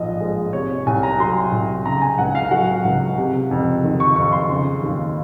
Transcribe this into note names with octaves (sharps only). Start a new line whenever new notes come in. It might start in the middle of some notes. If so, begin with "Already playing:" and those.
Already playing: A#1 G#2 F3 D#5
G#3
C3 C#5
C#5
C2 G#5
A#5
F#3 C6
C2
C#3 A#5
G#5
C#2 F#5
F5
F#3 F#5
C#2
C3
F2
D#3
C#6
F2 C#6
C6
C#3
D#2